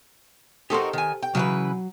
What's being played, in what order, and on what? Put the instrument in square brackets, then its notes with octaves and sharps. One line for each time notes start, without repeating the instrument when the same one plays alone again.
[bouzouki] D#4 F#4 A#4 [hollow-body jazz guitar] G4 A4 C5
[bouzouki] D#3 G#5
G5
[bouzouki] C#3 E3 B4 [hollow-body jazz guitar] F#3